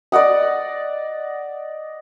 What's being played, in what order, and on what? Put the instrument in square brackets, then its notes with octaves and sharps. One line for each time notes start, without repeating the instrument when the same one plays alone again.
[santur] D5 D#5 F#5 D#6